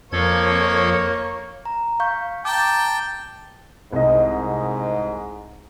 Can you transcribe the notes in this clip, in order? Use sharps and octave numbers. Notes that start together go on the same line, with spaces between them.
F2 F3 A#3 A4 C#5 G#6
A#5
F5 C#6 G6
G5 A5 A#5 D6
C2 G#2 D#5